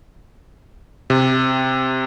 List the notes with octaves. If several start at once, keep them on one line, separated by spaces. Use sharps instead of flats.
C3